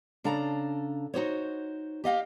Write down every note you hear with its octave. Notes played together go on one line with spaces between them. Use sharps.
C#3 D4 A4 F5 A#5
D#4 F#4 C5 C#5
G4 D#5 F5 G5